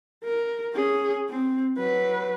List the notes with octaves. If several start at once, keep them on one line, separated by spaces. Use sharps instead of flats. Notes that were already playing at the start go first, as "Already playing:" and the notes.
A#4
C#4 G#4
C4
F#3 B4